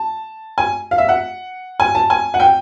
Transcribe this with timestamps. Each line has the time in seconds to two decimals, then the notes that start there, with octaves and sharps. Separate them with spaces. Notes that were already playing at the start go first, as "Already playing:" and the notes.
Already playing: A5
0.58 G#5
0.91 F5
0.98 E5
1.09 F#5
1.80 G#5
1.95 A5
2.10 G#5
2.34 F#5
2.40 G5